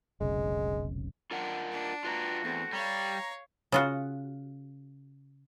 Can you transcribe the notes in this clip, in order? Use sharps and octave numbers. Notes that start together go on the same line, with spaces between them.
F1 B1 C#3 G#3
D4 F4 A#4 F#5
D4
F4 F#4 B4 A#5
E2 A3 C4
G3 C#5 F5 A#5
C#3 F4 F#4